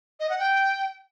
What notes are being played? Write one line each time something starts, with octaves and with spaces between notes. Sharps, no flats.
D#5
F#5
G5